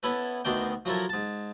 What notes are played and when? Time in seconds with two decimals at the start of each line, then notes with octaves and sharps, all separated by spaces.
0.03 B3 C#4 E4 A4 B4
0.45 D2 D#3 B3 D4 G5
0.85 F3 F#3 E4 A4 A#4
1.09 G#2 A5